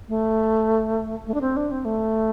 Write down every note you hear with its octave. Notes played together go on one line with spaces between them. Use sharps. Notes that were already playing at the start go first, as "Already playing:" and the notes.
A3
A3
D4
C4
D4
C4
A3